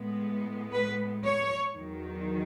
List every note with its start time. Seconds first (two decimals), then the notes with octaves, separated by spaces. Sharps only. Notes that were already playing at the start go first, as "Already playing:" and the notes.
Already playing: A2 G#3 B3
0.72 B4
1.24 C#5
1.76 E2 D#3 F#3